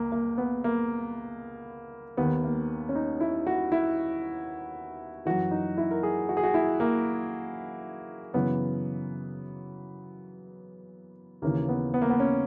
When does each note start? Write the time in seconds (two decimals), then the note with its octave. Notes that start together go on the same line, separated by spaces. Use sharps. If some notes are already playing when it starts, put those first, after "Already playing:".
Already playing: C#2 A#3
0.12 A#3
0.38 B3
0.64 A#3
2.17 D#2 D#3 B3
2.44 A#3
2.89 C#4
2.95 D#4
3.20 E4
3.47 F#4
3.72 E4
5.25 F#2 E3 F#4
5.51 D#4
5.77 E4
5.91 A#4
6.03 G#4
6.29 F#4
6.37 G#4
6.43 F#4
6.54 E4
6.80 A#3
8.34 F#2 C#3 E3 B3
11.42 D#2 C#3 E3 A#3
11.69 B3
11.94 B3
12.02 A#3
12.10 B3
12.20 C#4